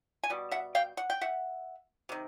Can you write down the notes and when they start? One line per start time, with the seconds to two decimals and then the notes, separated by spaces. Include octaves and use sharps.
0.24 G#5
0.30 B2 G3
0.51 E5 F#5
0.75 F5 G5
0.97 F#5
1.10 G5
1.21 E5 F#5
2.09 C3 D#3